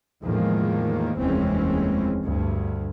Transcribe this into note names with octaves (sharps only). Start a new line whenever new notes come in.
E2 A2 D#3 F3 G#3 A#3
F1 D#2 E3 G#3 C4 C#4
D2 G2